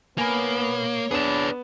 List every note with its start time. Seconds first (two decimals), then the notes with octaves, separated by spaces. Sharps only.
0.18 A#3 B3 C#5 G#5 B5
1.11 B3 D4 G#4 B4 E7